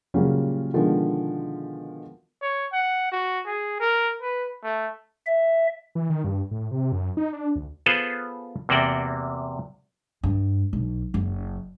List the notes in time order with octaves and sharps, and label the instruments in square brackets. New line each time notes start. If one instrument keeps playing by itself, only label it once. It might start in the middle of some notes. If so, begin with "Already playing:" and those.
[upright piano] A#2 C#3 F#3 G3 C#4
B2 D3 D#3 F3 G#3
[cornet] C#5
F#5
F#4
G#4
A#4
B4
A3
[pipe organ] E5
[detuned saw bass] E3
D#3
G2
A2
C3
F#2
D#4
D4
D2
[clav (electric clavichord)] B3 F4 G#4 A4 B4 C5
E2 C3 A#3 F#4 D5 G5
[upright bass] G2
B1
F#1